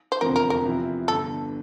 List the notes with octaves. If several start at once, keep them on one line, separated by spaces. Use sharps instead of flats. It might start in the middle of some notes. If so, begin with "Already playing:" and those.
C5
F1 E2 D3 F3 C4 A#4
A#4
A#4
E2 C3 F3 C4 E4
G1 G2 D3 A4